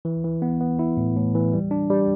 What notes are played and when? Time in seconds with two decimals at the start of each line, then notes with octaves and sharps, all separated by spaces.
0.05 E3
0.24 E3
0.42 B3
0.61 B3
0.79 E4
0.97 A2
1.16 A2
1.35 E3
1.53 G3
1.71 D4
1.90 G3